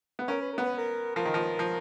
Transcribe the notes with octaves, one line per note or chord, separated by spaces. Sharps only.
B3
C#4 A#4
B4
B3 A#4
B4
A#4
F3 A#4
D#3
F3
F3